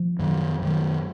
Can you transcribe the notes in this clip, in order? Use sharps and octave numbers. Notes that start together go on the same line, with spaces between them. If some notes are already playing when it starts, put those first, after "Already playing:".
Already playing: F3
F#2 D#3 F#3
F#2 D#3 F#3